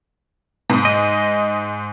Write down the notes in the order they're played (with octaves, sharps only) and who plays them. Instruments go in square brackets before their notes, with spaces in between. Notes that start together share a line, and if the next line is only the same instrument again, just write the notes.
[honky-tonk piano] G#2 D#6
[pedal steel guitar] D#5